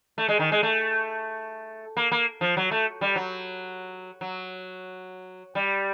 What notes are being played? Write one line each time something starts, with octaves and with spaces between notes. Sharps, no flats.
A3
G#3
D#3
G#3
A3
A#3
A#3
F3
F#3
A3
G3
F#3
F#3
G3